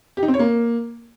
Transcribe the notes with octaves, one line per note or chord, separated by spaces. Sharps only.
G4
D#4
C4
C#5
A#3